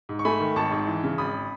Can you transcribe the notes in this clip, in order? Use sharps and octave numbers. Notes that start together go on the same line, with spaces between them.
G#2
C#6
A3 G#5 B5
D#3
G#1 A5 C#6
G#2
E3
C#3
G#1 B5 D#6